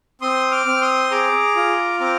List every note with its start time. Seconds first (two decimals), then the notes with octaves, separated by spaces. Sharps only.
0.22 C4 C6 D#6
0.51 D6 F6
0.66 C4
0.81 C6 D#6
1.11 G#4 A#5 D6
1.56 F4
2.00 C4 A#5 D6